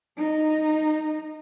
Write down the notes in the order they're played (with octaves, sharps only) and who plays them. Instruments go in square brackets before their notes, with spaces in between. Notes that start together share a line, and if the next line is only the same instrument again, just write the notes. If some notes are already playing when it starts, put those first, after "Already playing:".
[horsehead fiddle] D#4